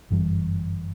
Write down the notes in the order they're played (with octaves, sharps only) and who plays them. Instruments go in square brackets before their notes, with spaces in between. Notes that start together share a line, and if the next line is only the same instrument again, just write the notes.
[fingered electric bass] G1 F#2 E3 G3